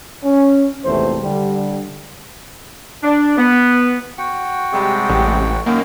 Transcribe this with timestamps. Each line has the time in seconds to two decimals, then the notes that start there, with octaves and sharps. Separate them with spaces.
0.24 C#4
0.85 G#1 E2 C3 A3 C5
1.22 D3 G3
3.03 D4
3.38 B3
4.18 F#4 F#5 G5
4.73 C3 G3 G#3
5.09 A1
5.66 F#2 D#3 A#3